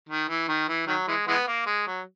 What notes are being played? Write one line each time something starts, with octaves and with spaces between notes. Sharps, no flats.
D#3
E3
D#3
E3
D#3 F#3
E3 G#3
E3 G#3 B3
A#3
G#3
F#3